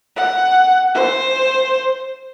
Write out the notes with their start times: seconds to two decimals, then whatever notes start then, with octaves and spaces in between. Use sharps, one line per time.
0.16 F#5
0.95 C5